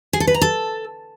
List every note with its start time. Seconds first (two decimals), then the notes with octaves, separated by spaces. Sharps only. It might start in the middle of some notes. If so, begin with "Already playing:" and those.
0.13 G#4
0.20 A4
0.27 B4
0.34 A#5
0.42 A4